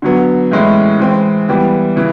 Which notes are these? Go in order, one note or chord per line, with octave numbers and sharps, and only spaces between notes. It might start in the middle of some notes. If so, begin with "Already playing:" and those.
D3 F#3 B3
A2 E3 G#3 C#4 E4
E3 G#3 C4
E3 G3 B3
C#3 E3